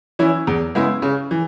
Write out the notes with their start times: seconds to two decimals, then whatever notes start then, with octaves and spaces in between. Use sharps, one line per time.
0.19 E3 C#4 E4
0.47 E2
0.75 C#3 G#3 B3 E4
1.02 C#3
1.31 E3